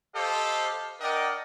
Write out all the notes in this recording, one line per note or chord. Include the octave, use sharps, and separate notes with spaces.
G4 A4 C5 D#5 F5
D4 A#4 D5 D#5 F#5 G5